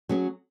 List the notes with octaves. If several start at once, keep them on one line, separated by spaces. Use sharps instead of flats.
F#3 C#4 G#4